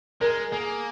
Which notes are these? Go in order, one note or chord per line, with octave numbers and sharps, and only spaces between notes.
G#3 A#4
A#3 G#4